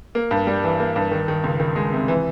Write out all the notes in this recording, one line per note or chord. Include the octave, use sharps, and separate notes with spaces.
A#3
G2
G3
E3
A#3
G2
D#3
D#3
C#2
D#3
G#3
C3
E3